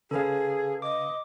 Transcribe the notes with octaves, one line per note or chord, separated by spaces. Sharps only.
C#3 G#4 A4 B4 F5
D#5 D6